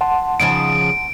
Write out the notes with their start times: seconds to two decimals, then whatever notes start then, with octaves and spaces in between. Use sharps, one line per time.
0.01 F#5 A5 C6
0.40 C#3 F3 D#4 D7